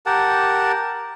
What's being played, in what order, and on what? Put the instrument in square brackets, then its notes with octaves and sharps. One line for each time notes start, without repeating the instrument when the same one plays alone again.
[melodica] G4 A#4 F#5 A5